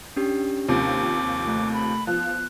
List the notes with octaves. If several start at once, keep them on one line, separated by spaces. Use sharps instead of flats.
C#4 D4 G4
D#2 C3 F3 D6
A3 F#6
B5
F3 B3 F#6